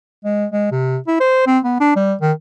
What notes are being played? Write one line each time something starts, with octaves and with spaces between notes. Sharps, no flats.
G#3
G#3
C3
E4
C5
C4
B3
D4
G3
D#3